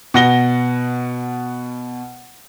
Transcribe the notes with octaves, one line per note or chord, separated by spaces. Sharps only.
B2 F#5 A#6 G7